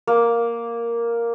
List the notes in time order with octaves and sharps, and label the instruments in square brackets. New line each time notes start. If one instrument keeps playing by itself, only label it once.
[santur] A#3